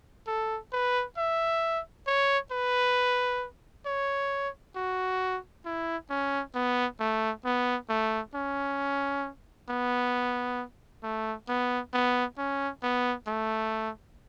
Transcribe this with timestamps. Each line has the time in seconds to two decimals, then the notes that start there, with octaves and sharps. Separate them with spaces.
0.27 A4
0.72 B4
1.17 E5
2.07 C#5
2.52 B4
3.86 C#5
4.76 F#4
5.65 E4
6.10 C#4
6.55 B3
7.00 A3
7.45 B3
7.89 A3
8.35 C#4
9.69 B3
11.03 A3
11.48 B3
11.93 B3
12.38 C#4
12.83 B3
13.27 A3